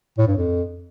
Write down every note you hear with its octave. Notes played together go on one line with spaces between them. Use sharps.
A2
G2
F2